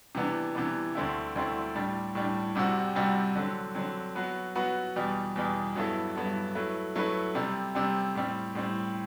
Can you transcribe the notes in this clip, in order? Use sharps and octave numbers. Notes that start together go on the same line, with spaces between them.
C3 E3 B3 D4
C3 E3 B3 D4
D2 D3 A3 C4 E4
D2 D3 A3 C4 E4
A2 G3 D4
A2 G3 D4
C2 C3 G3 C4 F#4
C2 C3 G3 C4 F#4
D3 F#3 C4
D3 F#3 C4
F#3 B3 F#4 B4
F#3 B3 F#4 B4
E2 B2 G3
E2 B2 G3
G2 F#3 B3 E4 A4
G2 F#3 B3 E4 A4
F#3 A3 E4 B4
F#3 A3 E4 B4
C3 G3 C4
C3 G3 C4
A2 G3 C4
A2 G3 C4